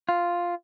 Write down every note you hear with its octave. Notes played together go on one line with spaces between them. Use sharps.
F4